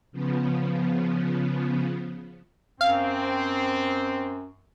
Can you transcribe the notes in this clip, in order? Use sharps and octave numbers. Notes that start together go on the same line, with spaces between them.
C#3 F3 B3
F#2 C4 F5